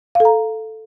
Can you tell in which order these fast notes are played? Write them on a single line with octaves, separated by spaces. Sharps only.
F5 A4 A#5